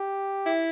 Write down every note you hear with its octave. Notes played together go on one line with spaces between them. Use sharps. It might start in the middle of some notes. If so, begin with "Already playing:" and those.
Already playing: G4
E4